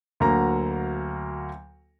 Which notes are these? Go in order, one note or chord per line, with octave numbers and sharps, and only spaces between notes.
D2 F#3 A#3 A#5